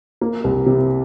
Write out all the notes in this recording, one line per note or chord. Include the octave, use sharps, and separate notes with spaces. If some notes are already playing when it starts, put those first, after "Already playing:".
A#3
C2
C3